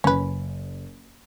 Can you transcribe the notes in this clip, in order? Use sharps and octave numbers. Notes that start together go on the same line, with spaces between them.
F#1 C#4 B4